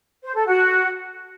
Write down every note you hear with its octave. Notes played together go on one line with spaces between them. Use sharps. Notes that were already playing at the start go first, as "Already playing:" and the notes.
C5
A4
F#4